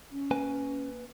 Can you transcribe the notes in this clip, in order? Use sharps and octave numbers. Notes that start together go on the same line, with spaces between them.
C#4
A#3 B4 G#5